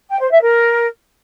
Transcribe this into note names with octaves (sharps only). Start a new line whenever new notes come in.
G5
C5
E5
A#4